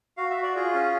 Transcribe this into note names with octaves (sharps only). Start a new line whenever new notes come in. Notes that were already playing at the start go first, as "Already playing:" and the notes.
F#4 F5
E5
F#4
D5
F4 G#4
C#4